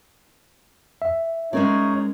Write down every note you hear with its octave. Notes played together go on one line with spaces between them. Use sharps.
E5
G#3 C#4 D#4 A#4 C#5 D5